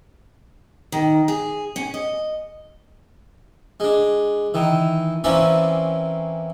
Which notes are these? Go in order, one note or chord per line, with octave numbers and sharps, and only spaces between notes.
D#3
G#4
C#4
D#5
G#3 D4
D#3 E3
E3 A#3 C4 C#4 D5 E5